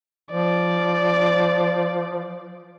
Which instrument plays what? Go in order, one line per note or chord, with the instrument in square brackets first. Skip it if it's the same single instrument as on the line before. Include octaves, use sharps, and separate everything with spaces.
[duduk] F3 [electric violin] D5